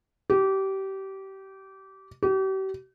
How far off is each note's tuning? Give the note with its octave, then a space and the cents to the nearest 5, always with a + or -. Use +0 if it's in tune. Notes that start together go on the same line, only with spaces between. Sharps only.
G4 -25
G4 -40